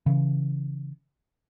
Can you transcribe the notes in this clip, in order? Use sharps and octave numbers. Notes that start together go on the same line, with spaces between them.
C#3 E3